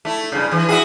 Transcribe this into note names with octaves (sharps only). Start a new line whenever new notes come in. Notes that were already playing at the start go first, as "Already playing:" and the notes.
A3 E4
G2 C#3
E3
E4 F#4 G#4